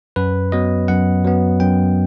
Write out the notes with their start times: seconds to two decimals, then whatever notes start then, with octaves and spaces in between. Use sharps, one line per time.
0.16 F#2 B4
0.52 F#3 B3 D#5
0.88 F#2 F#5
1.24 F#3 B3
1.60 F#2 G5